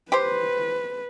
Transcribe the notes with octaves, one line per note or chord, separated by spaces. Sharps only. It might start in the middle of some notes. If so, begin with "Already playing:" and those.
G4 B4 C5